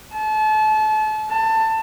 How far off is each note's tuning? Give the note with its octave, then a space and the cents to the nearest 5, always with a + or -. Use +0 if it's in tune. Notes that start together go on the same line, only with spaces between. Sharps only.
A5 -35
A5 +20